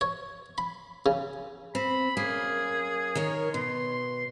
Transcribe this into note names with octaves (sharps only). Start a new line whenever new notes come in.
C#5
B5
C#3
C4 B5
F#2 A#3 G#4
D#3 A#4 C#5
B2 C6